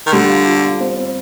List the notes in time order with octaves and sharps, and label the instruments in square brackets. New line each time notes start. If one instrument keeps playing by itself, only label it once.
[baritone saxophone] D#3
[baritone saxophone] D3 [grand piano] G3
[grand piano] F4
F4
F4
C4
C4